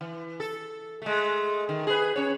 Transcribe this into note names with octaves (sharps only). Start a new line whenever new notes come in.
E3
A4
G#3 A3
D#3
G#4 B4
C#4 C#5